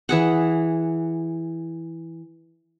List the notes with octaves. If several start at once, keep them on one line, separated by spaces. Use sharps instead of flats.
E3 G#4 F#5